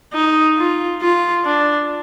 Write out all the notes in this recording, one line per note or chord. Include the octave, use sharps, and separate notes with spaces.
D#4
F4
F4
D4